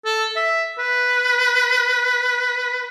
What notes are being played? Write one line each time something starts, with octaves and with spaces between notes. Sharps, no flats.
A4
E5
B4